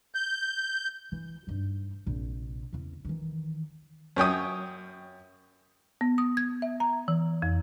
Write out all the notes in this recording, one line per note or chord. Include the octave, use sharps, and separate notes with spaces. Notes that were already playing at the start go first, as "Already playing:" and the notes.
G6
E3
G2 D#4
A#1 C3
E2 C#3
D#3 E3
F#2 C#5 G5 D#6
B3
D#6
G#6
E5
A#5
E3
F2